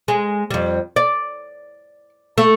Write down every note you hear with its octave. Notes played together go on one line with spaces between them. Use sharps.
G#3
F2 G3
D5
A3